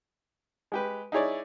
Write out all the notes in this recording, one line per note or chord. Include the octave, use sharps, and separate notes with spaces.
G#3 G4 B4
D#4 E4 G#4 C#5 D5